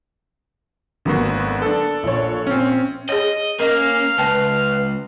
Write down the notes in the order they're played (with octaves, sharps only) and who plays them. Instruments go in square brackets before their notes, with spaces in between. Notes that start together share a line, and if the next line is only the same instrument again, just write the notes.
[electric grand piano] G#1 F#3 F#4 [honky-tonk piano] D3 A#3 B3
[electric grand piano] D4 A4
[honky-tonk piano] A#1 C#5
[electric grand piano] C4 C#4
[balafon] G#4 C#5 [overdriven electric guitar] D#5
[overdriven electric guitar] A#3 [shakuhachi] C#4 [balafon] A#4 D#5 [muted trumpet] F5
[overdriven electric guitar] C#2 [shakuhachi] B4 [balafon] G5 A5